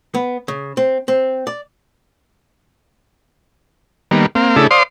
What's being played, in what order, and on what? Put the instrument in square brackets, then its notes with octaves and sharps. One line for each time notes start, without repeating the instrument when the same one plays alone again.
[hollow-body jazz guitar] B3
C#3
C4
C4
D5
[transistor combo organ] D#3 G3 A#3 B3
A#3 C4 F5
C#3 A3 D4 E4 G#4 A4
C5 D5 F5 C6 D#6